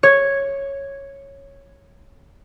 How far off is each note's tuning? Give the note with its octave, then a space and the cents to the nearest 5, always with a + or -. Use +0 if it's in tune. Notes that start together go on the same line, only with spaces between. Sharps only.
C#5 -5